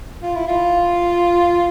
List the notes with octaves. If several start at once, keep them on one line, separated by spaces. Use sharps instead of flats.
F4
E4
F4